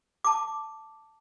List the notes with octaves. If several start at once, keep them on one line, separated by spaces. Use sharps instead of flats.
A5 D6